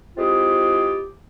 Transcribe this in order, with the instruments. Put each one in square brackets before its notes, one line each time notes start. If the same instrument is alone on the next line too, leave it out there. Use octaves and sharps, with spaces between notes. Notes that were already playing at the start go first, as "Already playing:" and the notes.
[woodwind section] G#3 C4 E4 F4 G4 G#4